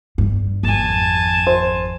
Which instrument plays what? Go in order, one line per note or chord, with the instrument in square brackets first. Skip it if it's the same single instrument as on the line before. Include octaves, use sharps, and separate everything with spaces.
[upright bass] G2
[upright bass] G#1 F2 [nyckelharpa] G#5 A5
[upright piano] C5